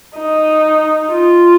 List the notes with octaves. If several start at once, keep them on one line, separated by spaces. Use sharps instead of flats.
D#4
F4